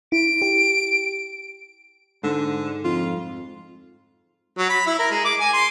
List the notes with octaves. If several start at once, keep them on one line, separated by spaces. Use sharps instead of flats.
E4 D7
G4
G#2 D3
F2 F4
F#3
B5
E4
A#4
G#3
D6
G#5
C6